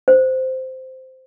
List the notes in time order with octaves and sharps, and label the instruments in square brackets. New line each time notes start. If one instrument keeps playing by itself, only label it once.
[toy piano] C5